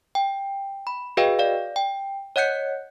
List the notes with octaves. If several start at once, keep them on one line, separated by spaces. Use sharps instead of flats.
G5
B5
F#4 G#4 B4 D#5 F5 G5
D5 F5
G5
C#5 D#5 F#5 F#6 G6 C#7